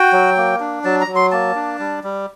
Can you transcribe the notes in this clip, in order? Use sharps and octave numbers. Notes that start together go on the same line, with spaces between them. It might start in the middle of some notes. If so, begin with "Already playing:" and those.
Already playing: F#4 G5
F#3
A#3
D4
F#3 A5
A#5
F#3
C6
A#3 A5
D4
G3
G3